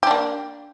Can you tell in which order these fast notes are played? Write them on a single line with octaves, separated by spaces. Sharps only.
G4 D4 A#3